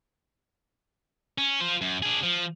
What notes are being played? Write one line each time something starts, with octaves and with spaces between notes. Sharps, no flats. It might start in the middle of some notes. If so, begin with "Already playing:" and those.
C#4
F4 C5
F#2
D4 G#4
F3